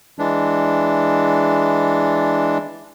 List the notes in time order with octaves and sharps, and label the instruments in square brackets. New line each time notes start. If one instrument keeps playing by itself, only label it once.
[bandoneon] E3 G#3 D4